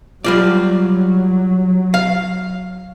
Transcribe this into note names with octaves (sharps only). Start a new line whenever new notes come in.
F#3 G3 F4 D5
F5